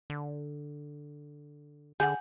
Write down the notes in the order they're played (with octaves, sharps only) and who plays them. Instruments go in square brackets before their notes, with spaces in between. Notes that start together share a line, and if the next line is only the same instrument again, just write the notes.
[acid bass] D3
[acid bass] D3 [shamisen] G#4 [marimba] F#5 G#5 G6